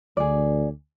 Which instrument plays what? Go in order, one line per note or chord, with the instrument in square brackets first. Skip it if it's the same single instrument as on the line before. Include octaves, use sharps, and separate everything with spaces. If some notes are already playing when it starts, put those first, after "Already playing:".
[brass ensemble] D2 [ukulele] G#4 D5